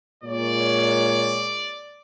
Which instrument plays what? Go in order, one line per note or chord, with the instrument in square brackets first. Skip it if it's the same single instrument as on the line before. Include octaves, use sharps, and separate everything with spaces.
[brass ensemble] A#2 G#3 C#5 [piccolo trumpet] D5